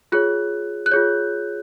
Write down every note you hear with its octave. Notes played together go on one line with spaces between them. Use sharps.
F4 G#4 C#5 F#6
F#6
F4 G#4 C#5 G6